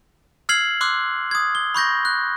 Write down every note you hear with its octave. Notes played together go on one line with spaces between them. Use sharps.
E6 F6 G#6 C7 F#7
C6 D6 E6 F#6
D#6 G#6
G7
B5 C#6 G6 A#6
F#6